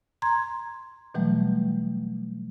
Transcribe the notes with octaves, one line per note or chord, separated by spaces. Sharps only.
A#5 C6 G#6
B2 E3 F#3 G3 A3